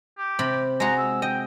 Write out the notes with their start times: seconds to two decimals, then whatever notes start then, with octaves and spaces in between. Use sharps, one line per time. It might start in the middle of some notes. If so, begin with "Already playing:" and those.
0.18 G4
0.39 C3 C4 B5
0.80 G#3 F#4 A#5
0.98 E6
1.22 D#5 G5